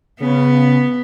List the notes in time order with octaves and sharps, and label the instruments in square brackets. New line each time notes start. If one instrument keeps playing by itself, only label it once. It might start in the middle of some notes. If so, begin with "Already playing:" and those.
[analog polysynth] C#3 [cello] B3